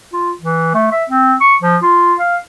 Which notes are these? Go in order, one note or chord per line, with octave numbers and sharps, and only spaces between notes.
F4
E3
A3
E5
C4
C#6
F3
F4
F5